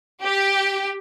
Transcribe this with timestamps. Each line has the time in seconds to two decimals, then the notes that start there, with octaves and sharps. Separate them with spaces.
0.23 G4